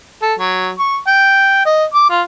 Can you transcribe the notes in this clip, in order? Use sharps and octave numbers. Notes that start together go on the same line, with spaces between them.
A4
F#3
C#6
G5
D#5
D6
F4